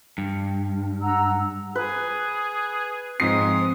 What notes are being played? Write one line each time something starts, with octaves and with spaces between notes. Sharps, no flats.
G2
F#5 A#5 E6
G#4 B4
G#2 F3 C4 D#6 C7